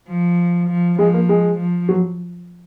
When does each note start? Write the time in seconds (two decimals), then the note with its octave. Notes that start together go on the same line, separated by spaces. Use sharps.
0.08 F3
0.69 F3
0.99 F3 G#3
1.14 A#3
1.29 G#3
1.58 F3
1.89 F#3